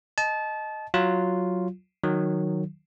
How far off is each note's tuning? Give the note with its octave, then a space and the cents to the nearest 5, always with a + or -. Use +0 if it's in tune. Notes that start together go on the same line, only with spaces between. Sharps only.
D#5 +0 A5 -25
F#3 +0 F4 +0
D#3 -15 F#3 -10